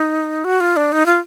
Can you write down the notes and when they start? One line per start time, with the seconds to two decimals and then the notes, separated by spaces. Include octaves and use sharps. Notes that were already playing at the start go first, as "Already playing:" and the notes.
Already playing: D#4
0.44 F#4
0.60 F4
0.76 D4
0.92 D#4
1.06 F4